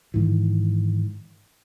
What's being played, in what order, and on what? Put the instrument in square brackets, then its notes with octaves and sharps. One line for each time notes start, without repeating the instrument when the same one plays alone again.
[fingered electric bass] G#2 D#3 E3